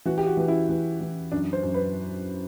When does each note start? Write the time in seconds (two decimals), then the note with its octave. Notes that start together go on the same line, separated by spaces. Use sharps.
0.05 E3 F#4
0.18 G4
0.27 F#4
0.37 E3
0.48 E4
0.69 E3
1.01 E3
1.31 F#2 D4
1.53 C5
1.63 F#2
1.74 B4